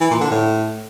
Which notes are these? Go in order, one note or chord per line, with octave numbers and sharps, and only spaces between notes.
E3
A#2
D3
A2